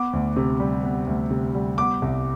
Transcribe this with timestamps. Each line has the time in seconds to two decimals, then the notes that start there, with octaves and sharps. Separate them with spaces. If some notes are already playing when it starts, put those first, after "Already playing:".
Already playing: B3 D6
0.13 D2
0.36 C3
0.60 G3
0.83 B3
1.07 D2
1.31 C3
1.54 G3
1.78 B3 D6
2.02 C2